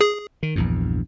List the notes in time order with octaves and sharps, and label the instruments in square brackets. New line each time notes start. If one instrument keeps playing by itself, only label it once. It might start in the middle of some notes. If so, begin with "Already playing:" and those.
[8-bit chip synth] G#4
[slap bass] D#3
A#1 E2 G2